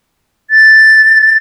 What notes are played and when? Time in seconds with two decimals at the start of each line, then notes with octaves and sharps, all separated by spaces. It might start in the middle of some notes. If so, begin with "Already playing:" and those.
0.51 A6